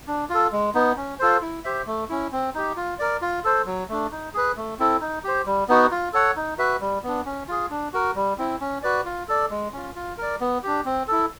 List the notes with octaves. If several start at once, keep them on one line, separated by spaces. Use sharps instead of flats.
D4
F4 A4
G#3
B3 D#4
C#4
F4 A4 C5
E4
G4 C5 E5
A3
C#4 E4
C4
D#4 G4
F4
A#4 D5
F4
A4 C5
F#3
A3 D4
D#4
G#4 B4
A3
C4 E4 A4
D#4
G4 C5
G3
B3 D#4 F#4
F4
A4 C#5 F#5
D#4
F#4 B4 E5
G3
B3 D4
C#4
F4 G#4
D4
F#4 A#4
G3
C4 E4
C#4
F#4 B4 D5
F4
A4 D5
G#3
C#4 F4
F4
A#4 D5
B3
D4 G4
C4
E4 A4